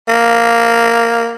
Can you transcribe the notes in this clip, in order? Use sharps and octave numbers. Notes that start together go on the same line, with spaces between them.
A#3